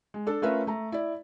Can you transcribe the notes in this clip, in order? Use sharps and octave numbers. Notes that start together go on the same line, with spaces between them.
G#3
D4 A4
A3 C#4 F4 A#4 B4 E5
A3 A#5
E4 D5